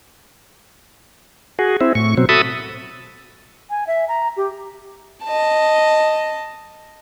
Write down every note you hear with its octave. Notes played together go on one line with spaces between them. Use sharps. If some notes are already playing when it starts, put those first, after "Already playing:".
F#4 G#4
C4 E4
A2 C#6
B2 F#3 C4
F#4 A4 E5 A5 B5 D#6
G#5
E5
A#5
G4
D#5 A5